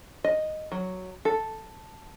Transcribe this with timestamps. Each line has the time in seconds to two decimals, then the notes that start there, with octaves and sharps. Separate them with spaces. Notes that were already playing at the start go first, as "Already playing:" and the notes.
0.24 D#5
0.72 F#3
1.25 A4